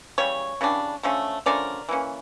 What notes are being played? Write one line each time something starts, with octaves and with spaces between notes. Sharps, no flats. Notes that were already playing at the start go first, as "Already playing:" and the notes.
C#3 E3 G3 C#5
C#3 E3 G3 D4
D3 F3 A3 C#4
D3 F3 A3 C#4 A#4 D5
E3 A#3 C#4